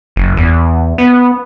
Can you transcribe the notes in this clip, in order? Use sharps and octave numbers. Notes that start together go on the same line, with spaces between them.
F#1
E2
B3